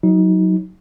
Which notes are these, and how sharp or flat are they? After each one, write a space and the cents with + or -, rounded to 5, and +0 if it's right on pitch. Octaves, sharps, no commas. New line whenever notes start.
F#3 +0 D#4 +25